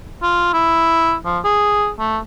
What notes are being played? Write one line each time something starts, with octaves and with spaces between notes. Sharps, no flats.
F4
E4
F3
G#4
A3